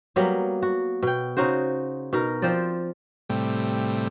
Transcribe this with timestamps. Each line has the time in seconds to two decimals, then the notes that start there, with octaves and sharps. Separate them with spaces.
0.16 F#3 G3 A#3 B3
0.62 F#4
1.03 B2 G5
1.37 C#3 D#4 F#4 C5
2.13 B2 D#4 A#4
2.42 F3 C4 C5 D5
3.29 A2 C3 G3